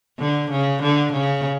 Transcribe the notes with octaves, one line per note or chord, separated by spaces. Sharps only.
D3
C#3
D3
C#3